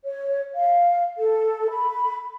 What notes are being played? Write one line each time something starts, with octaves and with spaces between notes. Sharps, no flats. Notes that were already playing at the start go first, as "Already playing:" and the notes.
C#5
F5
A4
B5